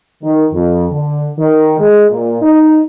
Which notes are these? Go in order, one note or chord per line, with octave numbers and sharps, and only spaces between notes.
D#3
F2
D3
D#3
G#3
A#2
D#4